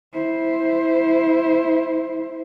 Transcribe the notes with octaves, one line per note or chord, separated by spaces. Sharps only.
E4 C5